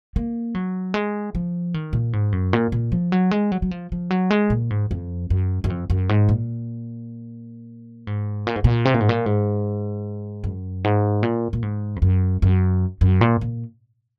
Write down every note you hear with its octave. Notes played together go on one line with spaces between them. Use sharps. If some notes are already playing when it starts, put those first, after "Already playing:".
A#3
F#3
G#3
F3
D#3
A#2
G#2
F#2
A#2
A#2
F3
F#3
G#3
F#3
F#3
F3
F3
F#3
G#3
A#2
G#2
F2
F#2
F#2
F2
F#2
G#2
A#2
G#2
A#2
G#2
A#2
C3
A#2
G#2
A#2
G#2
F#2
G#2
A#2
A#2
G#2
F2
F#2
F#2
F#2
A#2
A#2